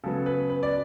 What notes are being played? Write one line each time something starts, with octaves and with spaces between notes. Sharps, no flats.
C#3 F#3 B3 A4
B4
B4
D5